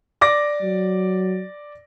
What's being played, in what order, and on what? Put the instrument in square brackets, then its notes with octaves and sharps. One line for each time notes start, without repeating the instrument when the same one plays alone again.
[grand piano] D5 D6 A#6
[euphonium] F#3